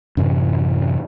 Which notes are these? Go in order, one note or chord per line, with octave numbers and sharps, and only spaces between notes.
F#2 A2 C3 E3